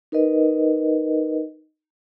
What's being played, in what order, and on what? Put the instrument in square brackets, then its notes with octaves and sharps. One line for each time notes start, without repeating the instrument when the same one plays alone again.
[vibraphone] D#4 A#4 B4 D#5